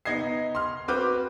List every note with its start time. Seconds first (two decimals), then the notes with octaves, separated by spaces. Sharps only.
0.05 B3 D#4 D#5 G#6 C7
0.55 C6 F6
0.88 C4 F#4 B4 D6 F6 G6